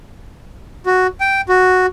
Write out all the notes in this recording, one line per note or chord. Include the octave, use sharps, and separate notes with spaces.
F#4
G5
F#4